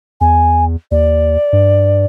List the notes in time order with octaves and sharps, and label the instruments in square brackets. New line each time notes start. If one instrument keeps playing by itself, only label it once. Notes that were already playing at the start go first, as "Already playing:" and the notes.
[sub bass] E2 [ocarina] G#5
[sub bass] D#2 [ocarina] D5
[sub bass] G2